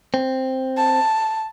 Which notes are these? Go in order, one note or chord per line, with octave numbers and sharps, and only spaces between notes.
C4
A5